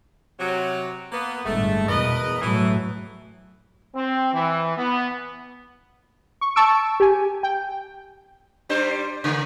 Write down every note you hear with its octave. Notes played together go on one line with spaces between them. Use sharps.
C3 F#3
A#3 B3
G1 A2 G#3 A3
E2 B2 A#4 B4 D#5
A2 E3 F#3 A3
C4
E3
B3
C#6
A5 C#6 E6 D7
G4 G#5
G5
G3 D4 C5
C#3 A3